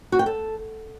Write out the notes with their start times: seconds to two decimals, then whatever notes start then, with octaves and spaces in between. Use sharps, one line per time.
0.12 F#4
0.19 G5
0.26 A4